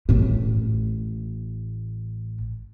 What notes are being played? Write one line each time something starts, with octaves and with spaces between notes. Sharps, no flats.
A1 A2